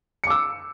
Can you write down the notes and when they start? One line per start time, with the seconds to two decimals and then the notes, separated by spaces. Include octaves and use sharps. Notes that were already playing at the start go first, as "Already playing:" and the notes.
0.24 C#7
0.27 D6
0.30 E6